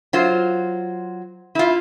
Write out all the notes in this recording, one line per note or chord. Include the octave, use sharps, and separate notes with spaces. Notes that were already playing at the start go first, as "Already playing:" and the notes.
F#3 F4 C5
E4 F4